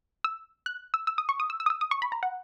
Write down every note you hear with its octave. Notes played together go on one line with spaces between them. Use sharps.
E6
F#6
E6
E6
D#6
C#6
D#6
E6
E6
D#6
E6
D#6
C#6
B5
A#5
F#5